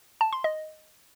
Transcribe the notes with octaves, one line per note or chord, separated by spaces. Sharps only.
A5
C6
D#5